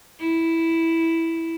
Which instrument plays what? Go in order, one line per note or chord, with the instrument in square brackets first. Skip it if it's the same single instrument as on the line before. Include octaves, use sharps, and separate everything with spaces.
[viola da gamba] E4